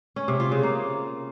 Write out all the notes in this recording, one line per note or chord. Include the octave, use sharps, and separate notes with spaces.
C#4
C3
F4
C#3
A#3